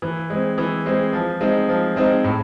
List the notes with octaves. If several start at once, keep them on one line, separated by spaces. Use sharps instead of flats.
E3
G#3 C4
E3
G#3 C4
F3
G#3 C4 D#4
F3
G#3 C4 D#4
A2